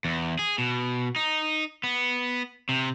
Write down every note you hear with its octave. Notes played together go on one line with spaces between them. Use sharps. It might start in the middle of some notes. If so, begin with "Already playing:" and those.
E2
G#4
B2
D#4
B3
C3